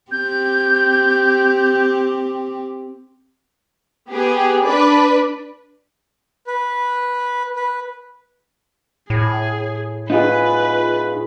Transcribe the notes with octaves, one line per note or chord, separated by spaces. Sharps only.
C4 G4 G6
B3 G4 G#4
D4 B4 D5
B4
B4
A2 G#4
D#4 F4 G#4 B4